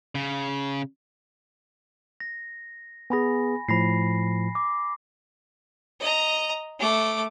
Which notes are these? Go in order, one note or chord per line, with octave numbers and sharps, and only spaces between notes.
C#3
A#6
B3 G#4 G#5 B5 A#6
A2 F3 B5 A#6 C7
D6
D#5 A#5
A3 D6